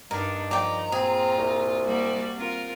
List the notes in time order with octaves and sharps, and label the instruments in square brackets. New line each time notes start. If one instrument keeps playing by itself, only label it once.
[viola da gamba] G2 D4 D#4 [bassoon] D#3 [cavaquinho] A#4
[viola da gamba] F3 [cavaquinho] D5 G5 [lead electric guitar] A#5
[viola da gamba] A#2 F4 [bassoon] C4 [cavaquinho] G#4
[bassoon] C2
[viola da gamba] G3 A#3 F#4
C4 F4 A#4